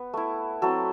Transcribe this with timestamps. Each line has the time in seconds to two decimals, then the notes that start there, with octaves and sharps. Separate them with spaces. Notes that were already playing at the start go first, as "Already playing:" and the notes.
Already playing: B3
0.14 A3 E4
0.62 F#3 C4 E4 A4